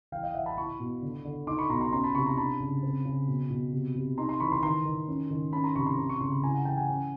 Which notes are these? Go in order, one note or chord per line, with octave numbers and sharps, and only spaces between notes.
E3 F5 G5
D#5 F5
E3 E5 F#5
A5 B5
E4 B5 C#6
B2
D3
D3
D#4 C6 D6
B5 C#6
B2 A#5 C6
A#5 C6
C#4 A#5 C6
A5 B5
C3 B5 C#6
A#5 C6
D4 A5 B5
C#3
C4
C#3
B2
B2
C3
C3
D#4 A#5 C6
A#5 C6
E3 B5 C#6
A#5 C6
D#3 A#5 C6
D#3
C#4
D#3
C#4 A5 B5
A#5 C6
C3 B5 C#6
A#5 C6
C4
C#6
C#3 C6
B5
E4 G#5 A#5
F#5 G#5
E3 G5 A5
F#5 G#5
C#4